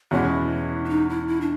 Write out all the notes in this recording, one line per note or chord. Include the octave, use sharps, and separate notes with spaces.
E2 B2 G#3 C#4 E4 F#4
D4
D#4
E4
E4
D4